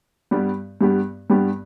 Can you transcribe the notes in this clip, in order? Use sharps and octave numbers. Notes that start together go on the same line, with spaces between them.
G2 G3 B3 G4
G2 G3 B3 G4
G2 G3 B3 G4